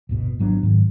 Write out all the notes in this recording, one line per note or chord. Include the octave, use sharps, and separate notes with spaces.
D1 G1 B2
G#1 F#3 B3 D4
G#2 D#3 F#3